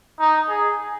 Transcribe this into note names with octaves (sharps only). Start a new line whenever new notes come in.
D#4
G#4